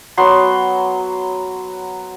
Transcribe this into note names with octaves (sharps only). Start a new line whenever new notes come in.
F#3 B3 C6